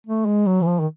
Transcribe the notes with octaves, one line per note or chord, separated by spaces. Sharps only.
A3
G#3
F#3
E3
F3
D#3